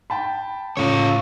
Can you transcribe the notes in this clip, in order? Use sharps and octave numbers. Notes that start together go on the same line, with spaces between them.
G5 A5 B5
A2 C#3 F4 C#5